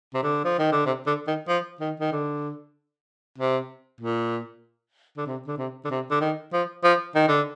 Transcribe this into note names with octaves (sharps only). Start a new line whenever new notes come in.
C3
D3
F3
D#3
D3
C3
D3
D#3
F3
D#3
D#3
D3
C3
A#2
D3
C3
D3
C3
D3
C3
D3
D#3
F3
F3
D#3
D3